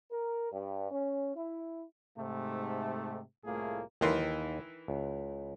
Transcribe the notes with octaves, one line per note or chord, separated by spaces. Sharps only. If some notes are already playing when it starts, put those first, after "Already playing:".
A#4
G2
C#4
E4
G#2 C3 A3
C2 A2 A3 A#3 F4 G#4
D#2 D#3 E3 C6
C#2